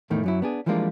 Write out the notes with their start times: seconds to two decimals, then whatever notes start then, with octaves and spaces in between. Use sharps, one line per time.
0.10 E2 A2 D#3 A3
0.23 F#2 F#3 E4
0.42 B3 D4 G#4
0.66 E3 F3 G3 G#3 A#3 D4